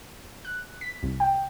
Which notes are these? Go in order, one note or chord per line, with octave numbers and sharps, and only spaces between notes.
F#6
B6
C2
G5